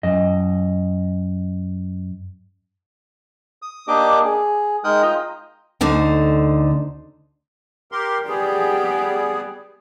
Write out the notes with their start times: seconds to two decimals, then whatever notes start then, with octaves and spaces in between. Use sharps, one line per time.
0.03 F#2 D#5
3.62 D#6
3.88 A#3 D4 G4 D#5 D6
4.25 G#4
4.84 G#3 D#4 A#4 G5 D#6 F#6
5.02 F4 D#5 G5 A#5
5.81 D2 D3 D#4 C5
7.92 G4 A#4 C6
8.28 G3 B3 G4 G#4 D5